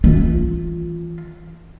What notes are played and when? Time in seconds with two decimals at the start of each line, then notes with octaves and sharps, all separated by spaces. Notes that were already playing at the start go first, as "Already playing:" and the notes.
0.04 E3 F4